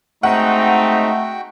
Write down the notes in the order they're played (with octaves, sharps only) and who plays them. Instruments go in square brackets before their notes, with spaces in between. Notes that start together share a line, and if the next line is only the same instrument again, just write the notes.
[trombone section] G#3 C4 D#4 [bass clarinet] A3 [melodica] F#4 G5 [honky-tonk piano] F#5